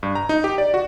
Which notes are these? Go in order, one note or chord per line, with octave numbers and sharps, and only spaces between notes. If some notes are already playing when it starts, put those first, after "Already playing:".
G2
A#5
D#4
G4
D5
F#4